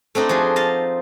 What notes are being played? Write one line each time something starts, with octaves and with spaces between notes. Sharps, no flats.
A3 C4 D4 D#4
F3 F#4 G#4
D#5 F5 A5